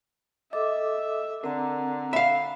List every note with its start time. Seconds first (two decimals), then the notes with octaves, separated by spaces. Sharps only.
0.53 A4 D#5 E5 D6
1.44 D3 C4 A#4 A#5
2.13 E5 F5 B5